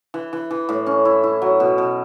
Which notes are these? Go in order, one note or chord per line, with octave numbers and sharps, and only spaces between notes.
E3
E3
E3
A2
C#4
E4
E4
F#3
B2
B2